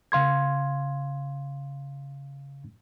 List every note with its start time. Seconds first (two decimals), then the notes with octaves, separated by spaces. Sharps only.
0.12 C#3 F5 C6 G#6